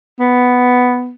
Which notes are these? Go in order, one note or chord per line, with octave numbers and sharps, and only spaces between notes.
B3